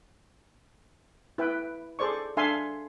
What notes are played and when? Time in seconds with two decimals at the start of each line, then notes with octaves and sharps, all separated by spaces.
1.38 E4 B4 G5
1.99 G#4 A4 C5 D5 C#6
2.37 D4 A4 E5 F5 G#5 C6